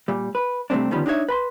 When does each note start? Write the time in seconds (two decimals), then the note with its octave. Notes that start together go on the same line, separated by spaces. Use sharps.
0.08 A#2 G3
0.35 B4
0.70 C3 G3 A3 C4 D4
0.91 D3 D#3 F3 G3 B3 C#4
1.06 D4 D#4 F#4 C#5 E5
1.29 B4 B5 C6